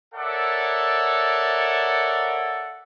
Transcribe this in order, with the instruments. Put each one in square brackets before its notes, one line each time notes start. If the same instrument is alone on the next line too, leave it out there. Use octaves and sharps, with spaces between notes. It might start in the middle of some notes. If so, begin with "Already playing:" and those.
[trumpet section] A4 A#4 C#5 D5 E5 F#5